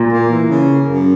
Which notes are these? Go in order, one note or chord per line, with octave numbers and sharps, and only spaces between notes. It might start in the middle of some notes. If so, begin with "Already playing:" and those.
Already playing: A#2
A#3
E3
C#3
A#3
F#2